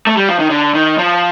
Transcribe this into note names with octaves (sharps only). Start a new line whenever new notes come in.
A3
G3
F3
D#3
D3
D#3
F3